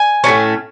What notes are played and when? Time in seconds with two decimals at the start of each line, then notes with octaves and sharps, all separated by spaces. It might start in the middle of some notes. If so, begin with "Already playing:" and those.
Already playing: G#5
0.24 A2 E3 A3 C#4